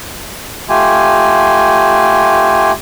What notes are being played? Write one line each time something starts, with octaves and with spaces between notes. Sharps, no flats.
A3 F4 G4 G#5